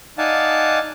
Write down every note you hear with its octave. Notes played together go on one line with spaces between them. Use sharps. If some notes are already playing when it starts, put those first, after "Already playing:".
D#4 D5 F5 F#5 G#5 A5